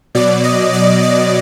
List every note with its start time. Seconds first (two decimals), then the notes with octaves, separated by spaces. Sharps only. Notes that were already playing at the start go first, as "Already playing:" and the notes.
0.15 B2 F#3 D5
0.44 D#5
0.73 D5
1.03 D5